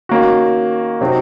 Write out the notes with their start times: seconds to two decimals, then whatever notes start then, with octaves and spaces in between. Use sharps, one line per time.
0.09 D#3 A#3 C#4 F#4
1.01 C3 F#3 C4 D#4